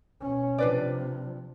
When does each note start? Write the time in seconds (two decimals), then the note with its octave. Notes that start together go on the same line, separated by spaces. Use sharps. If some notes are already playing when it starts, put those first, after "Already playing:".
0.21 B2 C#4
0.58 C3 F3 D4 B4 D5